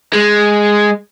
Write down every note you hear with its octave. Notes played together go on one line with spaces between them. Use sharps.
G#3